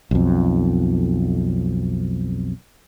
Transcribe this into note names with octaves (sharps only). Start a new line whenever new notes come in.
B1 F2